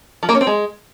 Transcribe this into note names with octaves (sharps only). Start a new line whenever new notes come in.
F3
A#3
C#4
C4
G#3